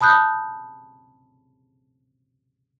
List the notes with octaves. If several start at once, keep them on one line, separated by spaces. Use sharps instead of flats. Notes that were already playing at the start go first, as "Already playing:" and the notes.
A5 B5 D#6 F#6 G6